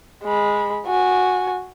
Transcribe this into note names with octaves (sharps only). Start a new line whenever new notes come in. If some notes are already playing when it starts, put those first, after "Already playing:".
G#3 B5
F#4 G#5